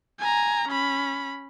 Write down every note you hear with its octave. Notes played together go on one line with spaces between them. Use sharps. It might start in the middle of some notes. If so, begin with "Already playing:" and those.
G#5 A#5
C#4 B5